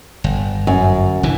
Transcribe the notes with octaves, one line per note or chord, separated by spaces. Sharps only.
G1
F#2
F1 D3 E3